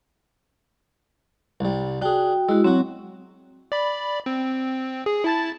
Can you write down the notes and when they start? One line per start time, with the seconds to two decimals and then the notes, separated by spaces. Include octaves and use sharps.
1.60 C2 G3
2.02 D4 F#4 G#4 G5
2.49 G#3 E4 F#4
2.64 F#3 C4 F#4
3.72 D5 B5
4.26 C4
5.06 G#4
5.24 E4 A5 A6